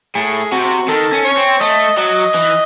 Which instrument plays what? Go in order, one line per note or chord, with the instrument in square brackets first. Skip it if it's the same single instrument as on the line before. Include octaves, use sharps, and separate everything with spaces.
[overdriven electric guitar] A2 [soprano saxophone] G#4
[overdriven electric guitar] C3 [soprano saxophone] F#4
[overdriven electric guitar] D#3 [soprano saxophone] A4
[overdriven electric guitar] C#4
[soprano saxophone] C#5
[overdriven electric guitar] C4
[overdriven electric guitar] A3 [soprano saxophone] D#5
[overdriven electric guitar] F#3 [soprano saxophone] D#5
[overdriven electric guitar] E3